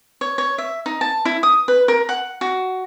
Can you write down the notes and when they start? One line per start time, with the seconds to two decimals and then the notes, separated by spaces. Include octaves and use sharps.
0.21 C#5
0.38 C#5
0.58 E5
0.86 D#4
1.01 A5
1.25 E4
1.43 D#6
1.68 B4
1.88 A#4
2.09 F#5
2.41 F#4